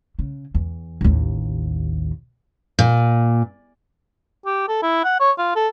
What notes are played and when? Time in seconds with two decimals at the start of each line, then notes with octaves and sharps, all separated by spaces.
0.19 C#3
0.55 E2
1.01 A1 D#2
2.79 A#2
4.46 G4
4.68 A4
4.82 E4
5.04 F#5
5.20 C#5
5.38 F4
5.56 A4